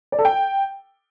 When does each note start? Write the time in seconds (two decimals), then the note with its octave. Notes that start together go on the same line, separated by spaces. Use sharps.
0.12 D5
0.19 A4
0.25 G5